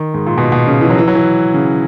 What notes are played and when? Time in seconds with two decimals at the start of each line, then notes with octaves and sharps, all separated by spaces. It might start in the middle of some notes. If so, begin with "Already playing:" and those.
Already playing: D#3
0.14 G#2
0.27 A#2
0.38 B2
0.52 B2
0.67 C#3
0.81 E3
0.90 F#3
0.99 E3
1.08 F#3
1.15 E3
1.54 C#3